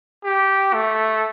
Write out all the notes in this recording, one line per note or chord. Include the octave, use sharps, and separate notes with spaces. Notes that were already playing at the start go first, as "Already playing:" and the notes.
G4
A3